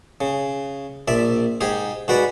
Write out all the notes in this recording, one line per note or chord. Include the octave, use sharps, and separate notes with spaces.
C#3
A#1 D5 E5
G#2 G4 G#4
G#2 F#4 B4 D5